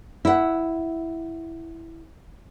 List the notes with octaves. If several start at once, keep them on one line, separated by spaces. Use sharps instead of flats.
E4 F#5